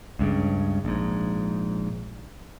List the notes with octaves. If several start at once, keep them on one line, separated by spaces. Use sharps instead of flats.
C#2 G2 C#3
A#1 G#2